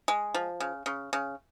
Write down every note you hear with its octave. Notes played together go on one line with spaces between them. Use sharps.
G#3
F3
C#3
C#3
C#3